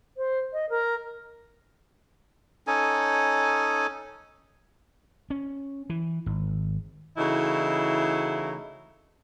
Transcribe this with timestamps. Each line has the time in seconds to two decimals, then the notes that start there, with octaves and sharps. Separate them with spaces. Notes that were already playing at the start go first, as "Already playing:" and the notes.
0.17 C5
0.52 D#5
0.70 A#4
2.67 C#4 D#4 A4 G#5
5.30 C#4
5.90 E3
6.26 G#1
7.18 C#3 E3 A3 D#4 E4 F#4